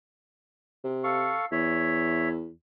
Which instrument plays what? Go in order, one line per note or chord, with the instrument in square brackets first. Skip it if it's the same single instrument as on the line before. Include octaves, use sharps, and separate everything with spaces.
[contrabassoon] C3
[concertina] A4 F5 C#6
[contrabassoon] E2 [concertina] C#5 E5